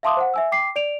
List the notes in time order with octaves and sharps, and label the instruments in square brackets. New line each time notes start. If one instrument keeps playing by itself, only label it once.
[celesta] E5 F5 A5 C6 D6 D#6
C5 F#5
E5 G#5 E6
G5 D6 C7
D5 D7 F7